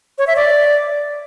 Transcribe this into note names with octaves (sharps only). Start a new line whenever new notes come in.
C#5
E5
D5